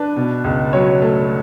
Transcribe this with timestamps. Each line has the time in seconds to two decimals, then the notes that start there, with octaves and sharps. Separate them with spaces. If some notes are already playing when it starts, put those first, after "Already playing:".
Already playing: D4 B4
0.16 B2
0.44 C#2
0.73 F#3 C#5
1.02 A3